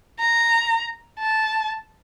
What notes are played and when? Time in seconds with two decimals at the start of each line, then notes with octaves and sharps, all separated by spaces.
0.20 A#5
1.19 A5